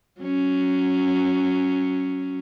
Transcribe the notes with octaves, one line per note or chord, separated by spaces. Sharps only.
F#3 C#4